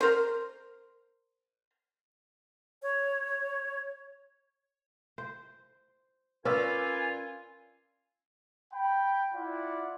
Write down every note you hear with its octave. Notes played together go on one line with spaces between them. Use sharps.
A#4 C5
C#5
C5
C#4 F4 A#4 B4 D5 G#5 E6
G5 B5
E4 F4 D5 F#5